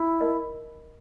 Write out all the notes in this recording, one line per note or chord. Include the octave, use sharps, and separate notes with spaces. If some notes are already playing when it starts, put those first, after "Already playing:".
Already playing: E4
D#4 A#4 D#5